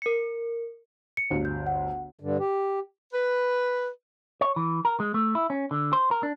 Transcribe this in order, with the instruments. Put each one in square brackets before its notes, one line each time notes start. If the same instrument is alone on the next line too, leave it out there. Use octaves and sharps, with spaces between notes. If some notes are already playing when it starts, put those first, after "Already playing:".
[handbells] A#4 C#7
[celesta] C#7
[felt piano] G1 D2
[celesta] G6
F#5
[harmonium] G2 D3
G4
[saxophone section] B4
[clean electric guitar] C#5
E3
A#4
G#3
A3
E4
C#4
D3
C5
A#4
D4